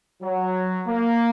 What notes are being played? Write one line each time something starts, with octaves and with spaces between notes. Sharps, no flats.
F#3
A#3